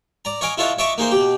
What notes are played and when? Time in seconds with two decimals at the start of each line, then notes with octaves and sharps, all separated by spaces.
0.25 D5 A#5
0.41 C#5 D#5 F5 G#5 D6
0.58 E4 F4 A4 C#5 D#5 F#5
0.79 C#5 D#5 E5 A5 C#6 D6
0.98 A#3 D#4 G#4 C5
1.11 B2 G4